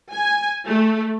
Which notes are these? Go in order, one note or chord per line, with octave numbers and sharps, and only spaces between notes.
G#5
A3